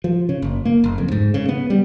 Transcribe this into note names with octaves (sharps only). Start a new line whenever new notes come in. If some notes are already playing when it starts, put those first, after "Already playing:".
F3
C#3
F#1
A#3
F#1
F2
G#2
C#3
B3
G3